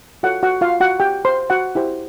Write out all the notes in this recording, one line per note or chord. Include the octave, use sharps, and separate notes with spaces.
F4 F#4 A4 C#5 F#5
F#4 F#5
F4 F5
F#4 F#5
G4 G5
C5 C6
F#4 F#5
E4 G4 C5